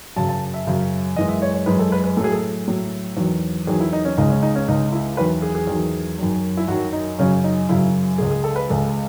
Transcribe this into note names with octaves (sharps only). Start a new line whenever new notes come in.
F#2 C#3 F#3 A5
A5
E5
F#2 C#3 F#3
F#2 E3 G#3 D#5
E5
C#5
C#5
F#2 E3 G#3 B4
A4
B4
B4
A2 F#3 G#4 A4
A4
A2 F#3
E2 D#3 F#3
E2 D#3 F#3 G#4
E4
D#4
C#4
C#2 C#3 G#3 D#4
C#4
D#4
C#4
C#2 C#3 G#3 D#4
E4
E2 D#3 F#3 B4
G#4
G#4
E2 D#3 F#3
F#2 D#3 F#3
E4
F#2 D#3 F#3 F#4
D#4
F#2 C#3 F#3 C#4
D#4
F#2 C#3 F#3 E4
C#2 C#3 G#3 G#4
G#4
A4
B4
C#2 C#3 G#3 A4